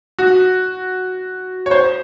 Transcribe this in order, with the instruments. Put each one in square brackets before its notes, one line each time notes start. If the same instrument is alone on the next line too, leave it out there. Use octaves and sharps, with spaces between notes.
[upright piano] F#4
C#5
C5